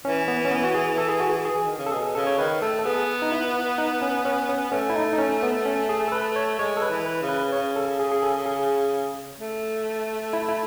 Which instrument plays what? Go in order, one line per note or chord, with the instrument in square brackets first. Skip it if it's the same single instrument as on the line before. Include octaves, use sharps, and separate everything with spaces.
[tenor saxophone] E3 [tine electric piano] C#4
[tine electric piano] B3
C#4
B3
F#4
G#4
A4
G#4
F#4
G#4
[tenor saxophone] E3 [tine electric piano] G#4
[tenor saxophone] D#3
C#3
[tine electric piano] A4
[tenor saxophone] B2 [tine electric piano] G#4
[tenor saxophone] C#3 [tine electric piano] A4
[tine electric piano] C#5
[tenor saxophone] D#3 [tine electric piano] B4
[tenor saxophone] A3 [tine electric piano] A4
[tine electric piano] A4
[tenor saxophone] B3 [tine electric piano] G#4
[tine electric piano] D#4
E4
D#4
C#4
C#4
C#4
[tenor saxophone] A3 [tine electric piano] C#4
[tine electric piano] E4
D#4
D#4
C#4
B3
C#4
G#4
A4
B4
C#5
[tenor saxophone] G#3 [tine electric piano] C#5
[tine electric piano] A4
B4
[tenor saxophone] E3
[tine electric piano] B4
[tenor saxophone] C#3
[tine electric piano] B4
[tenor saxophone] C#3 [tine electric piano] C#5
[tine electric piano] A4
G#4
G#4
A4
G#4
[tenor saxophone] A3
[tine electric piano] E4
E4